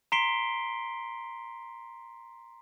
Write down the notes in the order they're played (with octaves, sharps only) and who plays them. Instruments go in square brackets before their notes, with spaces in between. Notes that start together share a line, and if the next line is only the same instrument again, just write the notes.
[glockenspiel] A#5 C6 B6 C7 D7 G7